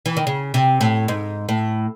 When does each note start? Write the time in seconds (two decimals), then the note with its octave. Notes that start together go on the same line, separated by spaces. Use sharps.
0.06 E3
0.17 D#3
0.27 C#3
0.54 C3
0.81 A2
1.08 G#2
1.49 A2